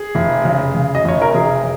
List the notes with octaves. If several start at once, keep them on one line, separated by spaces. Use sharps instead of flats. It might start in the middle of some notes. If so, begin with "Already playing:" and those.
Already playing: G#4
F1
C#3
C#3
D#5
F1 C#5
A#4
F1 G#4